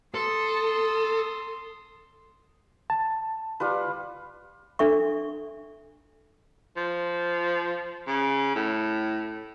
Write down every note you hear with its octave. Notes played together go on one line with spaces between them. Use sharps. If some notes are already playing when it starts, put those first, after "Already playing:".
A4 C6 D#6
A5
G3 F4 B4
D4 A4 E5 C#6
F3
C#3
A2